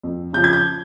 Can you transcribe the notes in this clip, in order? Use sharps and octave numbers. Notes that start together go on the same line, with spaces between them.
F2
C#3 F3 G6
G#6
G6